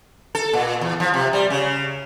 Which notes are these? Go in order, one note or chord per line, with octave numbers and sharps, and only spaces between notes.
A4
A#2
E2
F3
C3
G3
C#3